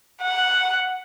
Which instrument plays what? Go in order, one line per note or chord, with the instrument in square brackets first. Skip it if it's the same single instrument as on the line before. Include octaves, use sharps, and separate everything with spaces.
[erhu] F#5